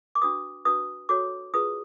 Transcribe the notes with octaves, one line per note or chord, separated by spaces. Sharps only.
D6
D4 F#4 B4 D#6
D4 F#4 B4 D#6
F#4 A4 C#5 D6
F4 G#4 B4 D#6